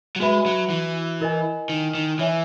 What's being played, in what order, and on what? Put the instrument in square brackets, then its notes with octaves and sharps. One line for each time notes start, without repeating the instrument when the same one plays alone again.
[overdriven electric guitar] F#3
[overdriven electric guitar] G#3 [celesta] F#4 B4 E5 B5
[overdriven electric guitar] F#3
E3
[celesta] E4 A#4 D#5 G#5
[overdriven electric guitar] D#3
D#3
[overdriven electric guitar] E3 [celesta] C#5 E5 G#5